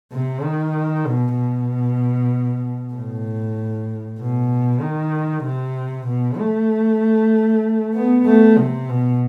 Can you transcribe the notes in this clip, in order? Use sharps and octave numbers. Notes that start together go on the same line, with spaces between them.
C3
D#3
B2
B2
A2
B2
D#3
C3
B2
A3
B3
A3
C3
B2